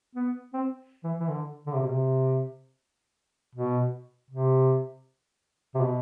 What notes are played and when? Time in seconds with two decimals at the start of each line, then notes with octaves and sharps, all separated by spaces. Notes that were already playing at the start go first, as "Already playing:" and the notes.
0.15 B3
0.53 C4
1.04 E3
1.20 E3
1.29 D3
1.67 D3
1.74 C3
1.82 B2
1.90 C3
3.55 B2
4.31 C3
5.75 C3
5.82 B2